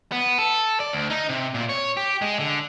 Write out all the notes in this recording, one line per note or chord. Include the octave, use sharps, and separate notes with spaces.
B3
A4
D5
D2
D#4
C3
A#2
C#5
G4
G#3
D3